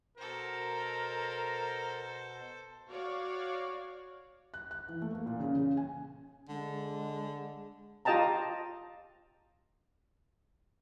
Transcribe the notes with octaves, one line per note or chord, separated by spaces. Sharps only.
B2 A4 A#4 C5
F#4 C#5 D5 F5
F#6
F#6
E3
A3
A#3
A#2
C#3
C#3
G#5
D3 G#3
F4 G4 D#5 G5 A5 A#5